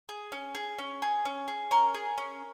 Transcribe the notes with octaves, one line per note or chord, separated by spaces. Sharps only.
G#4
C#4
G#4
C#4
G#4
C#4
G#4
C#4 A#4
G#4
C#4